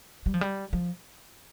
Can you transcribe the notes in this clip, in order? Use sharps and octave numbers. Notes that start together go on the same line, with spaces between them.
G3
F3
G3
F3